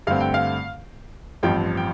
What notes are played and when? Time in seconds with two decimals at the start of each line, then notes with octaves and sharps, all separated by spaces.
0.07 G2 D3 A3 C4 F5
0.20 G5
0.34 F5
1.43 A1 G2 F3 C4 G5
1.77 G5